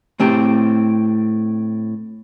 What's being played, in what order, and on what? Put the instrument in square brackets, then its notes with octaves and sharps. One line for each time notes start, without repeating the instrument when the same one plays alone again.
[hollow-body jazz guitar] A2 C4 G4